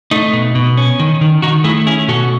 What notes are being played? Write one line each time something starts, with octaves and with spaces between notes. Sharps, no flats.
A3 D#4
B2
B2
C#4
D#3
D#3
D#3 D#4 F#4
A3 E4 G#4
C#4 E4 G#4
B2 F#4 A4